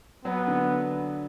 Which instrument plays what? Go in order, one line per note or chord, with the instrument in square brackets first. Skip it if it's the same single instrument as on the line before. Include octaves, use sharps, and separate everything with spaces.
[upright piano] F#3 [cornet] B3
[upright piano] D3